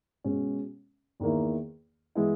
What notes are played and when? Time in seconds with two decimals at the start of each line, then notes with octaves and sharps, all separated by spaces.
0.24 B2 G#3 C#4
1.20 E2 D#3 A#3 E4
2.15 E3 G#3 B3 E4